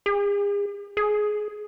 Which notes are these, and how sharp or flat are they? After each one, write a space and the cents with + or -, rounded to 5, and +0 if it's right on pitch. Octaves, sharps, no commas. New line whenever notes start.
G#4 -40
G#4 +20